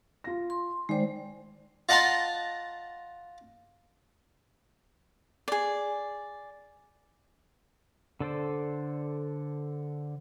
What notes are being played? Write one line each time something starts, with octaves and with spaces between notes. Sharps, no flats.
F4 F5 A#6
C6
D#3 G#3 C5 D5 G5
F4 D#5 F#5 A5 A#5 C6
G#4 D5
D3 A4 C5 D5